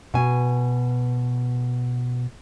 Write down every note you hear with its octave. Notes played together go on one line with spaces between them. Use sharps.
B2 G#5